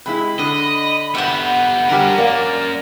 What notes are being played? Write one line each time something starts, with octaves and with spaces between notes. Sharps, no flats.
C3 G#3 E4 B5
D3 D#5
B3 G4 E5 F#5
D3 G3 C#4 G4 A#4
A#3 D5